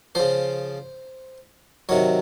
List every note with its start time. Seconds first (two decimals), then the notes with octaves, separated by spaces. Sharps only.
0.15 C#3 F3 C5
1.89 C3 D#3 F#3 C#5